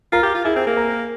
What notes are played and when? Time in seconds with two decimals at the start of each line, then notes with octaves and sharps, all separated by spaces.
0.12 F4 A#4 A#5
0.23 G4
0.35 F4
0.44 E4 G#4 G#5
0.56 C4
0.67 A#3
0.77 A#4 A#5